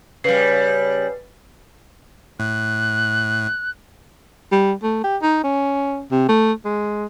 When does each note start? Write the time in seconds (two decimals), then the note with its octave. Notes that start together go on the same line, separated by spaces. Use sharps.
0.24 C#3 G3 B4 C7
2.40 A2 F#6
4.52 G3
4.83 A3
5.04 G4
5.22 D#4
5.44 C#4
6.12 C3
6.29 A3
6.65 G#3